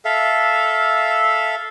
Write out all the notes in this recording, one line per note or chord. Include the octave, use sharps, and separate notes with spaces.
A4 E5 F5